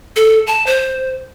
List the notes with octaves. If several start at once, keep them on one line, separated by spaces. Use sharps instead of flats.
A4
A5
C5